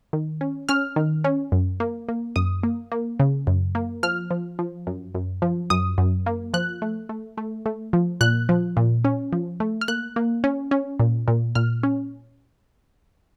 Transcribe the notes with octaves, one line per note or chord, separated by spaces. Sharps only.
D#3
C#4
C#4 F6
D#3
C#4
F#2
A#3
A#3
F#2 D#6
A#3
A#3
C#3
F#2
A#3
F3 F6
F3
F3
F#2
F#2
F3
F#2 D#6
F#2
A#3
F3 F#6
A3
A3
A3
A3
F3
A#2 F#6
F3
A#2
C#4
F3
A3
F6
A#3 F#6
A#3
C#4
C#4
A#2
A#2
A#2 F6
C#4